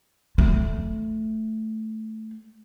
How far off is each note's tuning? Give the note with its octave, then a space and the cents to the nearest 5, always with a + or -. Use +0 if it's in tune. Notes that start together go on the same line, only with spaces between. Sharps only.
A3 -5